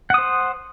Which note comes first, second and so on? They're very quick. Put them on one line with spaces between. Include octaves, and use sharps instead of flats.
F#5 D#6 C5